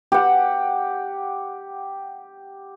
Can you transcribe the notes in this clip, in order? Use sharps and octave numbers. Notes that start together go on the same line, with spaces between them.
G4 F#5